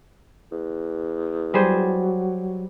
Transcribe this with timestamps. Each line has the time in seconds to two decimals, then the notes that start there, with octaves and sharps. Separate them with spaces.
0.52 E2
1.54 F#3 G3 G#4 C5